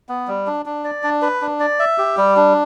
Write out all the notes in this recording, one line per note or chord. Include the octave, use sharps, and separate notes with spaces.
B3
G3
D4
D4
D5
D4
B4
D4
D5
E5
G4
G3
D4